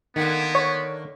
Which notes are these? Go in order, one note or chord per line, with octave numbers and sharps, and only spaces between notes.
D3 D#3 A#3 B3
C#5